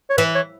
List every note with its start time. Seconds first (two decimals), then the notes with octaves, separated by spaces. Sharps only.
0.10 C#5
0.17 E3 B4
0.35 C#5